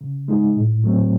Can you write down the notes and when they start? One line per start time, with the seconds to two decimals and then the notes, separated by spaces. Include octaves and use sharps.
0.01 C#3
0.28 G#3 D#4 G#4
0.56 A2
0.84 F#3 A3 C4